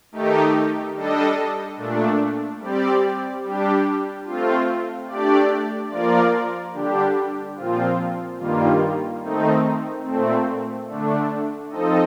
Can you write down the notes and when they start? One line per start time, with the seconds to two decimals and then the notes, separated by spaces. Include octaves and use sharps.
0.12 D#3 A3 D#4 G4
0.94 G3 D4 A4 D#5
1.77 A#2 A3 D4
2.59 G3 C4 G4 D5
3.43 G3 D4 G4
4.25 A3 C4 F4
5.07 A3 D4 G4 D5
5.90 F3 A#3 F4 A#4 D5
6.74 D3 G3 D4 G4
7.56 A#2 F3 C4 F4
8.39 G2 D#3 G3 A#3 F4
9.21 D#3 A3 C4 D#4
10.03 A#2 A3 C4
10.87 D3 A3 D4
11.70 F3 C4 D#4 A4 D#5